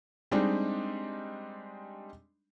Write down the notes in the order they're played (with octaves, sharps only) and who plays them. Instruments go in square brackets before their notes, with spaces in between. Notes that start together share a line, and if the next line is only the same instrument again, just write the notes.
[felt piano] G3 G#3 C4 D4 D#4